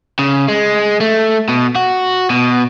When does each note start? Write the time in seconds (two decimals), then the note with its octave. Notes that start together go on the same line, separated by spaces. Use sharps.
0.19 C#3
0.48 G#3
1.01 A3
1.48 B2
1.76 F#4
2.30 B2